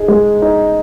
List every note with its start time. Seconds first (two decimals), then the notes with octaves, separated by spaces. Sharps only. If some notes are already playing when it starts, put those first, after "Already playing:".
Already playing: D#4 G#4
0.08 G#3
0.42 D#4